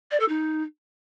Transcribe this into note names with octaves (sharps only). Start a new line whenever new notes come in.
D5
A4
D#4